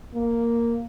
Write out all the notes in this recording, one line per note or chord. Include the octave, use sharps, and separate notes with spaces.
A#3